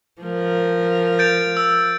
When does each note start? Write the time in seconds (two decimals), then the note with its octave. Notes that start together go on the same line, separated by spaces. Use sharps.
0.22 F3 A#4
1.19 G6 A6 D7
1.57 E6